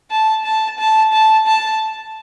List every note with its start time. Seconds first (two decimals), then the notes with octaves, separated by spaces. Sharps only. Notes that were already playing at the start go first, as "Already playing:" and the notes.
0.10 A5
0.44 A5
0.79 A5
1.13 A5
1.47 A5